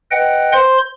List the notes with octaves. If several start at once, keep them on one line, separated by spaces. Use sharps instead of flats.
B4 D#5 F#5 G5
C5 C6